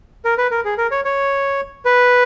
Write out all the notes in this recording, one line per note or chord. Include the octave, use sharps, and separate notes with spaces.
A#4
B4
A#4
G#4
A#4
C#5
C#5
B4